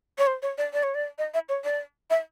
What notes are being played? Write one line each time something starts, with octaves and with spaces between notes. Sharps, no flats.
C#5
C5
C#5
D5
D5
C#5
D5
D#5
E5
C#5
D5
E5